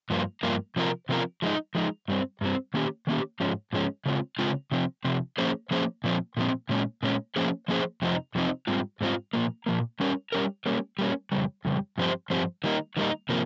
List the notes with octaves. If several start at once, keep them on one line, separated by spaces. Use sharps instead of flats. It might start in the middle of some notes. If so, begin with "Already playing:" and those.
G2 F3 A#3 F4
G2 F3 A#3 F4
C3 F3 C4 F4 A#4
C3 F3 C4 F4 A#4
F3 G#3 D#4
F3 G#3 D#4
G2 G3 C4
G2 G3 C4
D#3 A#3 C#4 G4
D#3 A#3 C#4 G4
G#2 F3 G#3 C#4
G#2 F3 G#3 C#4
C#3 G#3 C4 F4
C#3 G#3 C4 F4
C3 F3 C4
C3 F3 C4
F3 A#3 C#4 G#4 C5
F3 A#3 C#4 G#4 C5
A#2 F3 C4
A#2 F3 C4
A#2 G#3 C#4
A#2 G#3 C#4
F3 A#3 C#4 G#4 C5
F3 A#3 C#4 G#4 C5
F2 C3 F3 C4 D#4
F2 C3 F3 C4 D#4
G#2 G3 C4 F4
G#2 G3 C4 F4
A#2 F3 A#3
A#2 F3 A#3
G3 C#4 G4 A#4
G3 C#4 G4 A#4
G3 A#3 C#4
G3 A#3 C#4
F2 C#3 G3
F2 C#3 G3
G2 F3 C4 G4 C5
G2 F3 C4 G4 C5
D#3 G3 A#3 D#4
D#3 G3 A#3 D#4
C3 F3 A#3